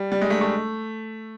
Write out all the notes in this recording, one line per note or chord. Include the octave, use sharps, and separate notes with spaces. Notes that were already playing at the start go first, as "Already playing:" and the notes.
Already playing: G3
G3
G#3
A3
A3